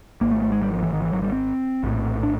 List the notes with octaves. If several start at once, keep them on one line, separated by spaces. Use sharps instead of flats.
G#1 G#2 A#3
A3
A3
G#3
G3
F3
E3
D#3
E3
F#3
G3
C4
A#1 A2
D4